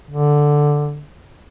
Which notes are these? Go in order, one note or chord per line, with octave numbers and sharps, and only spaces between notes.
D3